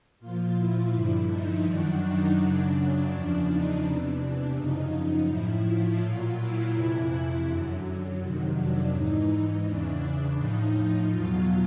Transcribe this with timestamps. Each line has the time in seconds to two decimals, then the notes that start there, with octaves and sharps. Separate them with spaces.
0.20 A#2 F3 F4
0.56 E4
0.93 G2 D3 F3
1.29 D#4
1.65 F#2 D#3 F#3 D4
2.02 D#4
2.38 F#2 C#3 F#3 D4
3.11 E2 C#3 F3
3.47 D#4
3.83 E2 C3 E3 D4
4.56 F#2 C#3 F3 D#4
5.28 A2 F3 E4
5.65 F4
6.01 A#2 F#3
6.38 E4
6.74 F2 C3 E3
7.46 F#2 D3 F#3
8.19 F2 C3 D#3 F#3
8.55 D4
8.91 G#2 E3 D#4
9.64 E2 C#3 E3 D4
10.37 A2 F3 D#4
11.09 E2 B2 F#3 F4